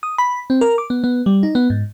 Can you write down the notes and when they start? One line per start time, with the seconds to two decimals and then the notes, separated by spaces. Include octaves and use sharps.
0.03 D#6
0.18 B5
0.50 C4
0.61 A#4
0.78 D6
0.90 B3
1.04 B3
1.26 G3
1.43 D#4
1.55 B3
1.70 G#2